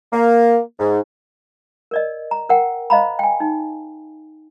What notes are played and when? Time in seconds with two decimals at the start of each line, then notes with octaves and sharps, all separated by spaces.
0.13 A#3
0.79 G#2
1.91 A#4 D5 D#5
2.31 A#5
2.49 A#4 F#5 G5
2.90 C5 D#5 F5 A#5 B5
3.19 G5 G#5
3.40 D#4